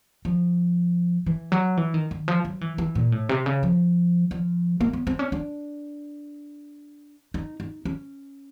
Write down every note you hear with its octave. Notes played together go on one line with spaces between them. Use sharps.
F3
E3
F#3
E3
D#3
D#3
F3
F#3
E3
E3
A#2
A2
C3
C#3
F3
F3
A#3
B3
C4
C#4
D4
D#4
D#4
C#4